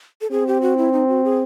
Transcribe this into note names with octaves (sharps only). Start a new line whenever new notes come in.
A4
C4 G#4
G4
F#4
E4
D#4
F#4
G#4